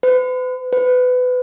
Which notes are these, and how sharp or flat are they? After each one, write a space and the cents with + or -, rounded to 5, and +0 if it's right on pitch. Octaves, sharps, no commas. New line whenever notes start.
B4 +40
B4 +25